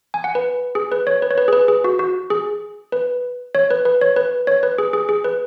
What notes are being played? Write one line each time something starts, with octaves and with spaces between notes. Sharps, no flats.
G#5
F#5
B4
G#4
B4
C#5
B4
C#5
B4
G#4
B4
G#4
F#4
F#4
G#4
B4
C#5
B4
B4
C#5
B4
C#5
B4
G#4
G#4
G#4
B4